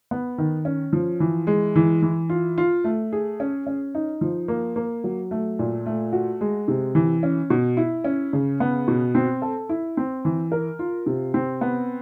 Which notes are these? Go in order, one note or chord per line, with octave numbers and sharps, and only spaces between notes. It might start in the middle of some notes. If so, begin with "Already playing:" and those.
B3
D#3
C#4
F3
E3
G#3
E3
E3
F4
F4
A3
G#4
C#4
C#4
D#4
F3
A#3
A#3
F#3
A3
A#2
A3
F#4
G#3
C3
E3
C#4
B2
E4
C#4
C#3
B3
B2
C4
A4
E4
C4
E3
A#4
F4
C3
C4
B3